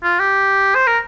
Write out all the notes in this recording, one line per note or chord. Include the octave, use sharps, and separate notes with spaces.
F4
G4
C5
A#4